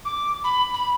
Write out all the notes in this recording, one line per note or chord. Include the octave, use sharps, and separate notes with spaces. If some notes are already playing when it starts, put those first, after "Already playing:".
D6
B5
B5